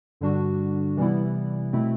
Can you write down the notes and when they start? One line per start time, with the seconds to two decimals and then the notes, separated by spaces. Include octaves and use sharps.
0.21 G2 D3 G3 D4 F#4
0.97 C3 E3 G3 B3 E4
1.73 B2 A3 C4 E4